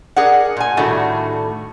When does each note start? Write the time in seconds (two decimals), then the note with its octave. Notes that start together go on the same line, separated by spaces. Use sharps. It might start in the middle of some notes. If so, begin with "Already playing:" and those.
0.16 G#4 A#4 D5 F#5
0.57 A#2 G#5
0.77 A2 D#3 G3 A3 D4 F#4